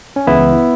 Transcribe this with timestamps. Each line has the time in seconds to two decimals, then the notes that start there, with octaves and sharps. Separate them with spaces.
0.16 C#4
0.27 C#2 C#3 E3 B3 E4